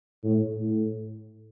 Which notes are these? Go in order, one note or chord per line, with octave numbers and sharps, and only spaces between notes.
A2
A2